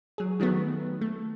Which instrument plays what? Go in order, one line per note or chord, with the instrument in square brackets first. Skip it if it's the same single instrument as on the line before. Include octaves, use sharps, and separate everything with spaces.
[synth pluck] F#3 G#4
D#3 F#3 A3 B3
A3